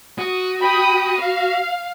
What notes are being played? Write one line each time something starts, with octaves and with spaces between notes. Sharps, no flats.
F#4 D#6
G5 B5 D#6
F5